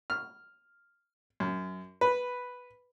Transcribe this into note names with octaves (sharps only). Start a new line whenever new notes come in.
F6
F#2
B4